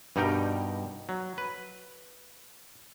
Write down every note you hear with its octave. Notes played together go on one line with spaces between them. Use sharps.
G2 B2 G3 D#4 A#4 G5
F#3
B4